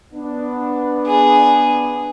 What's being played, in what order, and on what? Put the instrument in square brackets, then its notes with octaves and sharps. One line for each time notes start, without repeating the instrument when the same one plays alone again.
[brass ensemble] B3 D4
[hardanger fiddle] G#4